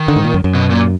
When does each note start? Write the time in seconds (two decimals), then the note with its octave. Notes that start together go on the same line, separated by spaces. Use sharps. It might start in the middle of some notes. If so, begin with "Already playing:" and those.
Already playing: D#3
0.08 D3
0.16 G#2
0.24 A#2
0.34 F#2
0.44 F#2
0.55 B2
0.70 A#2